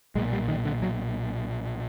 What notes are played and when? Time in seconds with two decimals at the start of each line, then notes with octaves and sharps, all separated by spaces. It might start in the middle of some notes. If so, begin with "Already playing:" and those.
0.15 B1 A#2 G#3
0.33 G3
0.48 D#3
0.65 D3
0.82 F#3